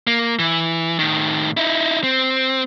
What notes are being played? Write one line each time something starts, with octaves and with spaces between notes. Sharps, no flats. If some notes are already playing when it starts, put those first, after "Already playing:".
A#3
E3
A2 D#3
D#4 E4
C4